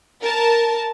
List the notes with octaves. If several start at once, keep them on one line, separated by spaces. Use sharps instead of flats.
A#4 A5